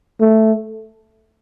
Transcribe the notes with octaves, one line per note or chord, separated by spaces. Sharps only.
A3